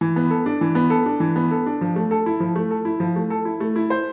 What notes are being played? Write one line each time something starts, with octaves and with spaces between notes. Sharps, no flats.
E3
B3
A4
D4
E3
B3
A4
D4
E3
B3
A4
D4
F3
A3
A4
E4
F3
A3
A4
E4
F3
A3
A4
E4
A3
E4
C5